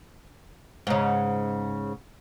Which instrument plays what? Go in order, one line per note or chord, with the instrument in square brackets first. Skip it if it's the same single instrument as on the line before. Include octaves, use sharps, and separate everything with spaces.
[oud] G#2 C#3